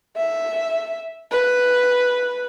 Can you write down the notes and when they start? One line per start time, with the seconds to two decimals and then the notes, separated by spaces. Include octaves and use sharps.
0.16 E5
1.31 B4